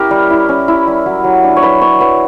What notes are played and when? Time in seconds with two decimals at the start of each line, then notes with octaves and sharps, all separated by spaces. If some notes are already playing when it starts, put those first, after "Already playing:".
Already playing: C#4 E4 G4 A#4
0.11 G3
0.30 E4
0.49 C#4
0.68 E4
0.87 G3
1.06 F#3
1.24 F#3
1.44 D4
1.57 C#5
1.62 F#3 B4
1.81 D4 C#5
2.00 F#3 B4